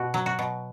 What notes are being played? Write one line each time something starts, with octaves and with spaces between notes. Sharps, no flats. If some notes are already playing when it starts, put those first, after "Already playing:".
Already playing: B2 F#4
F#3
F#4
B2